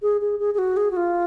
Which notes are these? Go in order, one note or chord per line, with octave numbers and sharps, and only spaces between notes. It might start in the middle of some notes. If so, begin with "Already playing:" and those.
G#4
G#4
G#4
G#4
F#4
G#4
F#4
F4